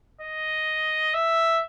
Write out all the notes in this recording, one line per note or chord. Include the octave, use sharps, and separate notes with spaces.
D#5
E5